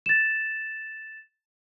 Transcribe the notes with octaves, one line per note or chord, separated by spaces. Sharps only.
A6 E7